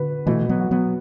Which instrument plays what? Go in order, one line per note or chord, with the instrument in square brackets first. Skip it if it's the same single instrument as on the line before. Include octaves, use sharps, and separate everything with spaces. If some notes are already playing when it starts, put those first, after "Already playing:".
Already playing: [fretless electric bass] D3 [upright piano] F#4 B4
[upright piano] B2 [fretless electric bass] E3 A3
[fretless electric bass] F#3 B3
[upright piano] F#4
[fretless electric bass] F#3 B3